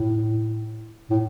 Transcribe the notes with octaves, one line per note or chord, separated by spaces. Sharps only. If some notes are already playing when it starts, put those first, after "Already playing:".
Already playing: A2
A2